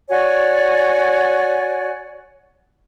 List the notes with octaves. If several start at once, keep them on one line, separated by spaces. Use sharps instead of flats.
F#4 C#5 D5 G#5